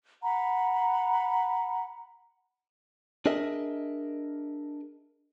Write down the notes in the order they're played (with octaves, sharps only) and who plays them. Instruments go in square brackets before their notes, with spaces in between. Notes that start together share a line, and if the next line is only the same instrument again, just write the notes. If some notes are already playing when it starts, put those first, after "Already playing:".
[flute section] F#5 A#5 B5
[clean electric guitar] D4 G#4 A#4 D#5 E5